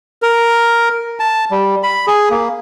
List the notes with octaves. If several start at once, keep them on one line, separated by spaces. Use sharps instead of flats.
A#4
A5
G3
B5
G#4
A#3